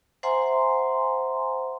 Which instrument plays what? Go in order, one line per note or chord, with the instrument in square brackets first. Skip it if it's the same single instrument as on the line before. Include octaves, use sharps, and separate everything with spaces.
[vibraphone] C5 E5 F#5 G#5 A#5 C6